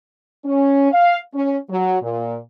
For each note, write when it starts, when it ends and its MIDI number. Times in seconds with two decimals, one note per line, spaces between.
0.45 0.91 61
0.92 1.18 77
1.34 1.57 61
1.69 1.98 54
2.02 2.37 46